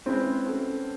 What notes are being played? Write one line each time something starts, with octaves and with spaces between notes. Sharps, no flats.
G#3 C4 C#4 E4 G#4 B4
A3 C#4 F#4 A4